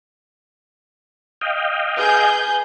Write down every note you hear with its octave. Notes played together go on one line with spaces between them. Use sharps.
D#5 F5 G5
G#4 B4 G6